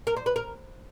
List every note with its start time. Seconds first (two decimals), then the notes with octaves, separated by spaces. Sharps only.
0.07 A#4
0.16 C5
0.26 B4
0.36 A#4